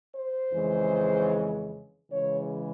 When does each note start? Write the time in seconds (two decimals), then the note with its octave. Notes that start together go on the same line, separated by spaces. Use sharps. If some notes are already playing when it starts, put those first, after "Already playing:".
0.12 C5
0.53 F2 C#3 E3 G#3
2.11 C#3 E3 G#3 C#5